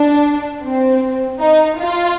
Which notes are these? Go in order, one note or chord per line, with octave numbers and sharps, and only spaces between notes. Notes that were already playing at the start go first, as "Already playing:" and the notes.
Already playing: D4
C4
D#4
F4